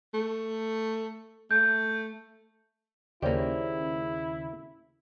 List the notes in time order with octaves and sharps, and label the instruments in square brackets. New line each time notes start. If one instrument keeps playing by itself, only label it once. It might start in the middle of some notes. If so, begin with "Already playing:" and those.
[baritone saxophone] A3
[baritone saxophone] A3 [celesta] G6
[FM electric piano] D#2 C#3 [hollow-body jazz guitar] A#3 G4 [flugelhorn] E4 [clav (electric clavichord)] C5 D5